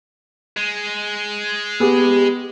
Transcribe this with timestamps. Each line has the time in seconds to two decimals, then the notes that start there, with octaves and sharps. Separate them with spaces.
0.57 G#3
1.80 B3 G4 G#4